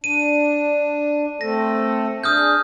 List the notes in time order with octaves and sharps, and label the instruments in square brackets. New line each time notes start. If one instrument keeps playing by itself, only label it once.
[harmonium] D4 [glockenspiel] D#7
[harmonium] A3 C4 A4 [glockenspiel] A#6
[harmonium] D4 G#4 [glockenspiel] D#6 F6 G6